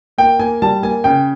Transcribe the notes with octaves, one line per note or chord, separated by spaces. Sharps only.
A#3 G5
A#3 G#5
G3 A5
A#3 G#5
C#3 G5